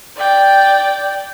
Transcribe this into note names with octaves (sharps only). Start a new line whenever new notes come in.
D5 G5